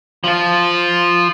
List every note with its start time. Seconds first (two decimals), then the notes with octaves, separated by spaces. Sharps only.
0.24 F3 F4